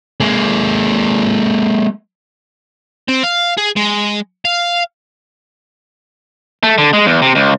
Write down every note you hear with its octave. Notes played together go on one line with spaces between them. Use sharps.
G#3 A#3
C4
F5
G#4
G#3
F5
A3
D3
G#3
E2
C3
C#2